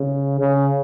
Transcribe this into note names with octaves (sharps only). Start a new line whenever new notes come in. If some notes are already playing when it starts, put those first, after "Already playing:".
Already playing: C#3
C#3